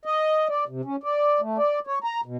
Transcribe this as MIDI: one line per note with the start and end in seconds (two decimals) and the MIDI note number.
0.05 0.48 75
0.49 0.64 74
0.68 0.82 48
0.85 0.96 61
1.03 1.41 74
1.41 1.58 57
1.58 1.79 74
1.87 1.99 73
2.04 2.20 82
2.26 2.37 47